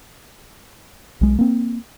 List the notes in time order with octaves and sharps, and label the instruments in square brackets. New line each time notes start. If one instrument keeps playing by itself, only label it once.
[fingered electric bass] B1 G#3
A#3 C4